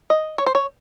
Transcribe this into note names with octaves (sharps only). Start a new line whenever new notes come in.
D#5
C#5
C5
C#5